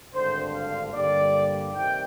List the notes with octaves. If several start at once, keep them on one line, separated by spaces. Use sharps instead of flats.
G#1 G2 D3 C5
F5
G2 D3 G3 A#3 D5
C3 D#3 G5